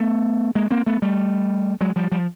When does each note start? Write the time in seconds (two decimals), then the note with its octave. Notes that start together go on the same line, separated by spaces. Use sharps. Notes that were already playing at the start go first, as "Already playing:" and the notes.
Already playing: A3 B3
0.55 G#3 A#3
0.71 A#3 C4
0.86 A3 B3
1.02 G3 A3
1.81 F#3 G#3
1.96 F3 G3
2.12 F3 G3